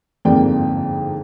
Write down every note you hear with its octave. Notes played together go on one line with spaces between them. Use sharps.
G1 F2 G#2 A#3 D5 G5